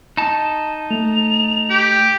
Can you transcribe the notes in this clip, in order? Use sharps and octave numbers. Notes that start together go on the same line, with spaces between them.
D#4 A5
A3 F7
G4